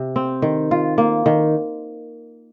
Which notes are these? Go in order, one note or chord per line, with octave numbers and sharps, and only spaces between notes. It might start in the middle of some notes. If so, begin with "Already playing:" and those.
Already playing: C3
C4
D#3
F4
A#3
D#3